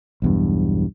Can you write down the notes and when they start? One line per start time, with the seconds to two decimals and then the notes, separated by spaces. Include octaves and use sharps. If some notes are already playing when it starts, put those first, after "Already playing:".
0.22 B1 E2 G2